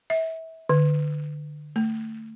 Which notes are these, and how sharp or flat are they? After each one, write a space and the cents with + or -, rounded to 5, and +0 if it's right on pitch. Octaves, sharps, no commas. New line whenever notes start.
E5 -25
D3 +25
A3 +20